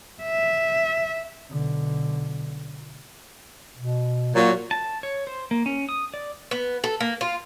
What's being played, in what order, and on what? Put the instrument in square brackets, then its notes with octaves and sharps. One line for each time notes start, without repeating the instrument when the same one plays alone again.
[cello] E5
[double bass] B1 D3
[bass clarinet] B2
[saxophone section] A#2 F#3 [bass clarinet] A#3
[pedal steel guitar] A5
C#5
C5
A#3
C#4
D#6
D5
[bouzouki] B3
A4
A#3
F4